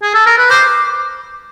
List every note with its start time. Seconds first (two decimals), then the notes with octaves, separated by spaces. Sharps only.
0.02 G#4
0.14 A4
0.26 A#4
0.38 B4
0.50 C5 D6